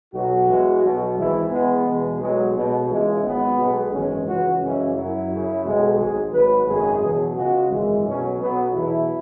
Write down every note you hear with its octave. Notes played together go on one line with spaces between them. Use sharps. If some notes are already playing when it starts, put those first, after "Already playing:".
B1 B2 F#3 F#4
E2 E3 G#3
B1 B2 F#3
G#1 G#2 E3 E4
E2 E3 G#3 B3
E2 B2 G#3
B1 B2 F#3 G#3
B1 B2 F#3 G#3
C#2 C#3 E3 G#3
G#1 G#2 F#3 B3
B1 B2 G#3
G#1 F#2 C#3 E3 G#3 C#4
C#2 C#3 E3 F#4
F#2 C#3 E3 G#3 C#4
F#2 F#3 E4
F#2 C#3 F#3
B1 B2 G#3
G#1 G#2 F#3 G#4
G#1 G#2 F#3 B4
G#1 F#2 C#3 G#3 G#4
E2 B2 F#3
C#2 C#3 G#3 F#4
G#1 F#2 E3 G#3
B1 B2 F#3 C#4
B1 B2 F#3 B3
E2 B2 F#3 E4